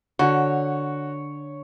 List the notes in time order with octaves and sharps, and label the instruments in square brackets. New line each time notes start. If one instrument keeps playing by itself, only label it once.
[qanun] D3 [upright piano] F#4 [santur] C#5